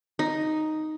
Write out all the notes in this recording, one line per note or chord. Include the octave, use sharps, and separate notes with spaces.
D#4